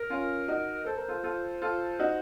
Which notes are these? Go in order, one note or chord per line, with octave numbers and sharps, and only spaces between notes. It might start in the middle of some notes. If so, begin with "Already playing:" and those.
Already playing: A#4
C#4 F4
D#4 F#4
A4 C5
A#4
F4 A4
F4 A4
F4 A4
D#4 F#4